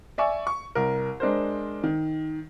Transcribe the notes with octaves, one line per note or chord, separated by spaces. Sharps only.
D5 E5 G#5 C#6
C#6
C2 A#4
G#3 D4 A#4 C5
D#3